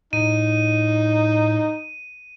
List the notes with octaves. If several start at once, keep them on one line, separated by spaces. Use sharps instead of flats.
A2 D#4 D#7